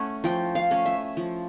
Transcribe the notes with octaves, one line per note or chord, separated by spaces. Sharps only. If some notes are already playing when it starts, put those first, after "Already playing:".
Already playing: A3 C#4 F#5
F3 G5
F5
A3 C#4
E5
F3